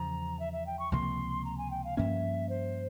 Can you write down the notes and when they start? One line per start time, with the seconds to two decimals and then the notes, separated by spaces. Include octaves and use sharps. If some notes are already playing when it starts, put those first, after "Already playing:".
Already playing: E2 C#3 F3 A#5
0.40 E5
0.53 E5
0.67 G5
0.79 C#6
0.92 C#2 C3 F3 A#3 C6
1.45 A#5
1.58 G#5
1.71 G5
1.84 F5
1.97 G2 F3 A#3 C#4 E5
2.49 C5